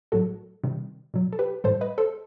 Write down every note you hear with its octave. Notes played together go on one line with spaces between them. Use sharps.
A2 F#3 F#4 A4
C3 D#3 G3
B2 F#3
A4
G4 B4
A2 E3 G3 A4 C5
B4 D#5
A4 C5